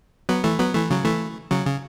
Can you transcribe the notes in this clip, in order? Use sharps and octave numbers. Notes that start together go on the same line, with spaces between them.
F#3 B3
E3 A3
F#3 B3
E3 A3
C#3 F#3
E3 A3
C#3 F#3
C#3